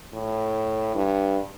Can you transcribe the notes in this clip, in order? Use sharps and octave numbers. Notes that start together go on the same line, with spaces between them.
A2
G2